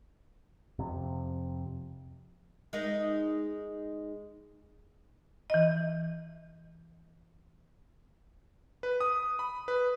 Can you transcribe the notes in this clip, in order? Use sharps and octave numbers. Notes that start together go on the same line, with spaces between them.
F2 C3
G#3 D#4 A#4
E3 D#5
B4
D#6
B5
B4